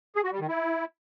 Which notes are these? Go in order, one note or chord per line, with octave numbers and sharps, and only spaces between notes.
G#4
F#4
G3
D#3
E4